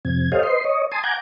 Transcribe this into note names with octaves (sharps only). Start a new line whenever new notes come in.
F2 C3 G#6
G4 A4 C5 C#5 D#5 F5
B4 C5 D#5 C6
C#5 D#5
G#5 A5 C6 D#6
F#5 G#5 A#5 D6 G6 G#6